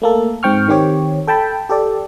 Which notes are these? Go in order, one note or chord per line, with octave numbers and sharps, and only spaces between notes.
A3 A#3 A4
G#2 C4 G5 C#6 F6
D#3 C4 G4 C#5
A4 G5 A5 B5
G4 A4 D5